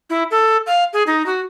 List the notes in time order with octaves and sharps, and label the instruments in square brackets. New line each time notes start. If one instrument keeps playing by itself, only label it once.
[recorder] E4
A4
F5
G#4
D#4
F#4